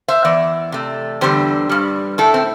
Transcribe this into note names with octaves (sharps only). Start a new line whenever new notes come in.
C5 E5
E2 E3 D5
C3 A3
E2 D3 G3 G4 C5
G2 G3
A2 A3 E4 A4
C4